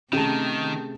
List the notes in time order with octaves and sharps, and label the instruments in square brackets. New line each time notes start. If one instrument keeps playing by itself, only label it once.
[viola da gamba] C3 A3 C4 [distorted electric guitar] D#3 [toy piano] C#4 [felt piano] G#4 A5